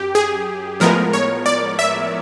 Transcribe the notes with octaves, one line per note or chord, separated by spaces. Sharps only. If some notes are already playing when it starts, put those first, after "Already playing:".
Already playing: F#2 G4
G#4
A2 F3 G#3 B3 A#4
C#5
D5
E5